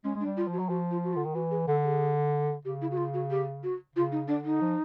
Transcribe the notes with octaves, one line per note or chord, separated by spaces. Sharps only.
G#3 C#4
G#3 D4
G3
F4
F3
F#4
F#3
F3 F#4
F4
F#4
F4
D3
D#3
E3 F#4
G#4
D3 A4
G#4
C#3 G4
E4
F#4
F4
F#4
G4
F#4
C#3 F4
D#4
D3 D4
D#4
F3